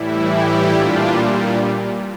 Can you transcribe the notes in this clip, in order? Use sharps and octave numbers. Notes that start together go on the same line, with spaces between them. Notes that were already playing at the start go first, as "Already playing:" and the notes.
Already playing: A2 E3 G3 E4
E4 G4
A#2 G3 D4 F4